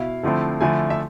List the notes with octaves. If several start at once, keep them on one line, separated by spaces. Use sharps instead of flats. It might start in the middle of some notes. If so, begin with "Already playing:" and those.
Already playing: B2 E4 F5
D3 F3 A3 C4 E4
D3 F3 A3 E4 G#5
E5